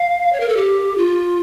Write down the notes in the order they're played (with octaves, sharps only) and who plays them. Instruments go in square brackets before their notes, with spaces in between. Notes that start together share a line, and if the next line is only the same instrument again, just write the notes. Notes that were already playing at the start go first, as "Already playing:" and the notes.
Already playing: [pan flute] F5
C#5
A#4
A4
G4
F4